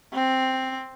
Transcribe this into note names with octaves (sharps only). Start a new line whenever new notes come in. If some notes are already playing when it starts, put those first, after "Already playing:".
C4